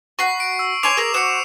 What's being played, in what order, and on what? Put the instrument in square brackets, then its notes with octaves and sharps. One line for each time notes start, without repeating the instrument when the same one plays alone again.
[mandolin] F#4 F#5 B5 [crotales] C#6 C7
[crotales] D7
E6
[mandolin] C#5 G#5 C6 [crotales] D6 C7 F7
[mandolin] G#4 A#4
[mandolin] F#4 C5 [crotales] C#7 E7